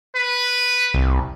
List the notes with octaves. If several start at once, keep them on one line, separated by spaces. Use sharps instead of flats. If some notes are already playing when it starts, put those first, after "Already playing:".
B4
C2